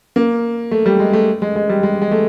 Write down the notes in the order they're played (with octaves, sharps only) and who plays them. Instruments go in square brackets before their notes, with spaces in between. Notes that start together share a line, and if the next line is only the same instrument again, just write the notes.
[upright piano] A#3
A3
G3
G#3
A3
G#3
G#3
G3
G#3
G#3
A3